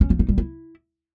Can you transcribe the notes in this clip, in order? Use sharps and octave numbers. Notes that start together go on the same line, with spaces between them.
C#4
F3
D#4
G3
E4